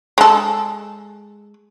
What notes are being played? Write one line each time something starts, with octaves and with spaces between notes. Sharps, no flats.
G#3 A4